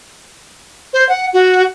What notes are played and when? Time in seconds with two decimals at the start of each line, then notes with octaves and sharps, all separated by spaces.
0.93 C5
1.09 F#5
1.33 F#4